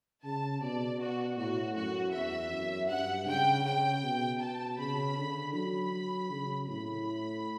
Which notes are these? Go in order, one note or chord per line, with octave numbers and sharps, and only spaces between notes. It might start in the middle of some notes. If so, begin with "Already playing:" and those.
C#3 A5
B2 D5
F#4
A2 F#4
F#2 F#4
E2 E5
F#2
G2 F#5
C#3 G5
C#3 G5
B2
A5
C#3 B5
D3
F#3 B5
C#3
A2 B5